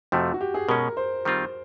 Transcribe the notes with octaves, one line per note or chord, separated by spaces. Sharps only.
F2 C3 F3 A3 F#4
F#4
G4
G#4
B2 G#3 C#4 A#4
C5
D#3 G3 C4 F4